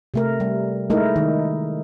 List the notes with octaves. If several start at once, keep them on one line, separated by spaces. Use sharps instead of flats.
C3 A3 A#4
G3
G#3 A3 D#4 E4 A#4
D#3